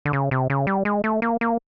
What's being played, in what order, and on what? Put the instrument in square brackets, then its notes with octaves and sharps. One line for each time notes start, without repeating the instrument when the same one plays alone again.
[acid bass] D3
C#3
C3
C#3
G3
G#3
A3
A#3
A#3